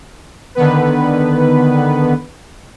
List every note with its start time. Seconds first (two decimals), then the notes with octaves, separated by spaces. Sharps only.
0.55 D3 D#3 B3 B4